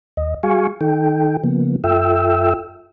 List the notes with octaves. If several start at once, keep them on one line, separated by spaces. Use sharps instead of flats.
D#2 D#5
G3 F#4 G#4 F5 G#5 C#6
D#3 D#4 A4 G5
C#3 F3 A#3 B3
F#2 F4 A4 E5 G5 E6